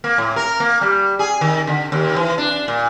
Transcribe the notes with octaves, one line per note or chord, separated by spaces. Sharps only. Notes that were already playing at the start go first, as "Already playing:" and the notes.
A#3
A2
A#4
A#3
G3
G#4
D#3
D3
D#2
E3
D4
A#2